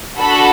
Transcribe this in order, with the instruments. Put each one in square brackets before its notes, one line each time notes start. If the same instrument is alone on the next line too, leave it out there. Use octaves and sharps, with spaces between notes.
[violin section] D4 F#4 A4 B5